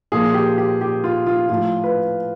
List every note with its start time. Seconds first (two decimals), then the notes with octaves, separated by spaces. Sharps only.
0.12 A#2 F3 G#4
0.34 G4
0.58 G4
0.81 G4
1.04 F4
1.27 F4
1.49 A2 F3 F4
1.84 B4